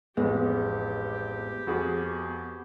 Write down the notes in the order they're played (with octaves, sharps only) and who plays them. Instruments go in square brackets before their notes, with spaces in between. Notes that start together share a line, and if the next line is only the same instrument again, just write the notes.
[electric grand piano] A1 F2 [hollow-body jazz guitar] G#3 [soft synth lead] B3 [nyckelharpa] G4
[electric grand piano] F2 F#4 G#4